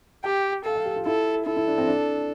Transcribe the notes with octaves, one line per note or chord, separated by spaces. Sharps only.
G4 G5
A4 F5
F5
G4
F4
E4 A4
E4 A4
E4
D4
C4
D4